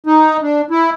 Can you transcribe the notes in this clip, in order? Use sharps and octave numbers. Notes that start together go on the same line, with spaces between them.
D#4
D4
E4